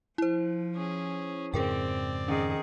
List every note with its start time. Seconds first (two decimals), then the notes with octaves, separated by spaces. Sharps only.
0.18 F3 E4 C5
0.75 C#4 G#4
1.54 F2 G#2 C#3 C4 G#4 A#4 D5 G5
2.28 D#3 C#4 G#4